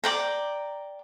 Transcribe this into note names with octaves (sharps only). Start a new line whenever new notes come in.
D5 G5 A#5